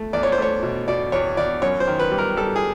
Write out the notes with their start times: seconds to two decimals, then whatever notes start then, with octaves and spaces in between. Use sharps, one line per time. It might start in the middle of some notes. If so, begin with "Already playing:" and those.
Already playing: A3
0.13 E2 D5
0.23 C#5
0.32 C5
0.38 A3 C#5
0.63 B2
0.88 B2 D5
1.12 E2 C#5
1.37 E2 D5
1.62 F#2 C#5
1.80 C5
1.87 D#3
1.99 B4
2.12 G3
2.18 A#4
2.37 G3 A4
2.56 G#4